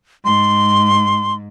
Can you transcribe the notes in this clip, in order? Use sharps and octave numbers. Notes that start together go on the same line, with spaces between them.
G#2 C6